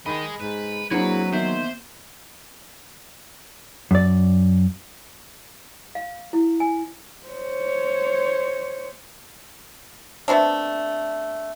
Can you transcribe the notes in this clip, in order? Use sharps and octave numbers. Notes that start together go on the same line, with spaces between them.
D#3 G#4 D#5 B5
G#2 B4
F#3 A#3 C4 D4 E4 F#4 G#4 B4
D#3 A#3 B3 C5 E5
F#2 D5
F5
E4
G#5
C5 C#5
A3 B3 C4 D4